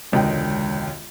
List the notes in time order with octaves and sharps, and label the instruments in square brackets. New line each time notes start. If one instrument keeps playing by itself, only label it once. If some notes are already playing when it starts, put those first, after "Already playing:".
[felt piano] E1 C#2 D3 D#5 G5